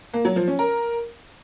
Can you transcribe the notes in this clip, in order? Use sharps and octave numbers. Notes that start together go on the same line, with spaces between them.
A#3
F#3
F3
C#4
A#4